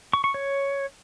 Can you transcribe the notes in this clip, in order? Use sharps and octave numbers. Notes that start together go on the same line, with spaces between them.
C#6
C#6
C#5